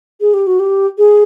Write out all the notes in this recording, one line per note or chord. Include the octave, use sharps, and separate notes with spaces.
G#4
G4
F#4
G4
G#4